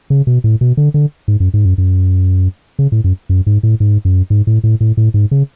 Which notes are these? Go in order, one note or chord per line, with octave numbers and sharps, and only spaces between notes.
C#3
B2
A2
B2
D3
D3
G#2
F#2
G#2
F#2
F#2
C#3
A2
F#2
F#2
G#2
A2
G#2
F#2
G#2
A2
A2
A2
A2
G#2
C#3